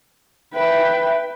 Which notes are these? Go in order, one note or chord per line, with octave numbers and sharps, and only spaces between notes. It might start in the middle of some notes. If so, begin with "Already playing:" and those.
B4 E5 G5